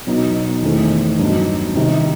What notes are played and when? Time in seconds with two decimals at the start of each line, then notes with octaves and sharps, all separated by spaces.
0.07 B2 F#3 B3 D#4
0.62 E2 D#3 A3 C4
1.19 G2 F#3 B3 D#4
1.75 C3 D#3 G3 D#4